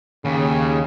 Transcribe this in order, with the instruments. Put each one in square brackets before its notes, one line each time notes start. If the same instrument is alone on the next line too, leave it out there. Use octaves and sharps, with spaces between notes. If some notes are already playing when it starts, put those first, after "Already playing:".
[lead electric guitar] D#2 [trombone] C#3